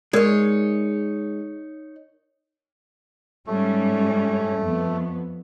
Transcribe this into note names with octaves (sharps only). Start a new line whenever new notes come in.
G#3 D#4 A#4 C#5 D5
G#2 G3 A3 C#4
F2 B3